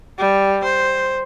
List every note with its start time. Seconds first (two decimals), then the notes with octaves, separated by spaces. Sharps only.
0.19 G3
0.65 C5